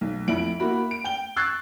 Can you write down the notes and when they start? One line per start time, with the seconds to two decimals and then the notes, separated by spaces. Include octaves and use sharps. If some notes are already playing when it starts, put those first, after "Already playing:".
0.01 B1
0.28 F2 E4 D7 F#7
0.60 A#3 E4 F#4 B5
0.91 D7
1.04 G5 G7
1.36 C#6 E6 F#6 G#6 A6 C7